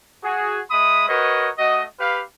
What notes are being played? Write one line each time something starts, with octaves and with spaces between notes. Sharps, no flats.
F#4 G#4
G#3 E5 B5 D#6
F#4 A#4 B4 C#5 D#5
A3 F#4 D#5
G4 B4 F5